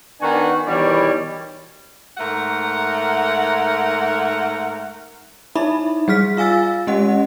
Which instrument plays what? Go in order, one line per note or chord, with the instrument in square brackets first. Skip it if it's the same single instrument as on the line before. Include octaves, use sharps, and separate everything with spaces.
[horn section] D#3 B3 D4 F#4 F#5 G#5
B2 D#3 E3 G3 C#5 D5
[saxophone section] G#2 A3 A#4 F#5
[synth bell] D#4 E4 E5 B5
G3 G#4 F6 B6
F4 F5 G#5 E6 A6
G#3 C#4 G4 D#5 F#5